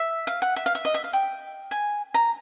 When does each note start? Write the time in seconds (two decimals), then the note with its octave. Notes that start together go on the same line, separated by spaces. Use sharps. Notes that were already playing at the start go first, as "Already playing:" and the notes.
Already playing: E5
0.27 F5
0.42 F#5
0.56 E5
0.66 F5
0.75 E5
0.85 D#5
0.94 E5
1.04 F5
1.13 G5
1.71 G#5
2.14 A#5